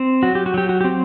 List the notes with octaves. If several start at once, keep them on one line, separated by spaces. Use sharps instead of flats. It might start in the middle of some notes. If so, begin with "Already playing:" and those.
Already playing: C4
F#3 F#4
G4
F#4
F#3 G4
F#4
C4 G4